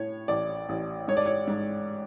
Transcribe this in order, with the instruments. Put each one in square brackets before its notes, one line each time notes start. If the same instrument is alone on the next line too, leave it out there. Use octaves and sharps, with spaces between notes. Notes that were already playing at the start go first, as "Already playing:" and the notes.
Already playing: [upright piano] A2 C#5
A1 D5
A1
G#2 C#5
D5
C#5
G#2